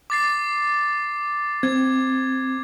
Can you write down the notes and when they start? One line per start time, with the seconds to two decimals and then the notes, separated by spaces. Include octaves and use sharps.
0.10 D6 A6 C7
1.63 C4 G#6